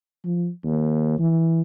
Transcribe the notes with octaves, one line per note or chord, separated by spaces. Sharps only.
F3
D#2
E3